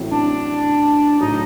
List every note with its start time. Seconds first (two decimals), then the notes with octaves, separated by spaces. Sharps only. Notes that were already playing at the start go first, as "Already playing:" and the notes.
Already playing: A1 A2 F#3 C4
0.10 D4
1.19 A2 F#3 D#4